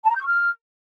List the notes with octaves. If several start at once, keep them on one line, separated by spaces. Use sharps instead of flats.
A5
A#5
G6
C#6
F6